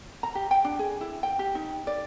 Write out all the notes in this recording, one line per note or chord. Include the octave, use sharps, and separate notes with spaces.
A#5
G4
G5
D4
G#4
E4
G5
G4
D#4
D5